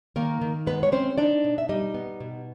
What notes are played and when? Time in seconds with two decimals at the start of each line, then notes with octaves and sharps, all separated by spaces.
0.16 D#3 A#3 A#4
0.41 D#3
0.66 G#3 B3 B4
0.83 C#5
0.92 C4 C#4 C5
1.18 D4 D#4 D5
1.44 B2
1.58 E5
1.69 G3 D#4 D#5
1.94 B3
2.20 B2